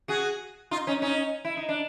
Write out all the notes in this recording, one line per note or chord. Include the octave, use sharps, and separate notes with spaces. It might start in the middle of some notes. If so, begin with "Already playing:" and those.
F#4 G#4
D#4 F4
C#4 D#4
C#4 D#4
E4
D#4
D4